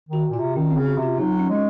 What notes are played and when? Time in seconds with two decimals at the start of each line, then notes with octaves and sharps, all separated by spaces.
0.09 D#3 F#4
0.30 A#2 F4
0.39 C3
0.56 D#3 C#4
0.71 C4
0.76 C#3
0.86 F#4
0.97 C3
1.03 F4
1.18 F#3 D#4
1.39 C#4
1.49 G#3
1.55 C#4